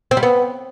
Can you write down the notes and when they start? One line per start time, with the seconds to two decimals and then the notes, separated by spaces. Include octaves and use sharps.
0.11 C4
0.17 G3
0.23 B3